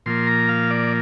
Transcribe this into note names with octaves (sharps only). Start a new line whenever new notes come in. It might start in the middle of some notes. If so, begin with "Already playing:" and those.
A#2 F3 A#3 C6
A#5
F5
D5